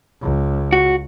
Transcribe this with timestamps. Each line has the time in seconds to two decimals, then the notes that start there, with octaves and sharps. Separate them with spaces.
0.21 C#2
0.73 F#4